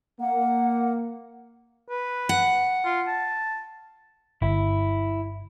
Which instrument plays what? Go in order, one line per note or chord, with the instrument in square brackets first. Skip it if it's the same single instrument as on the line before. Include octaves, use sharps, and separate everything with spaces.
[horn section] A#3 [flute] F#5
[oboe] B4
[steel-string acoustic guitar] F#5
[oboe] F4
A5
[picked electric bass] G1 [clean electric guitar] E4